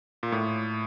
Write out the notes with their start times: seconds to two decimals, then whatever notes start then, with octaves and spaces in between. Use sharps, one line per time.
0.23 A#2
0.32 A2